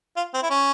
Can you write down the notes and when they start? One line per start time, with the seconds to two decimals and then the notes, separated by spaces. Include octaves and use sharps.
0.17 F4
0.34 C4
0.43 E4
0.50 C#4